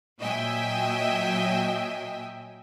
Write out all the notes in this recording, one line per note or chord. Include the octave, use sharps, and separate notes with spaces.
A#2 F#3 D#5 E5 G5 G#5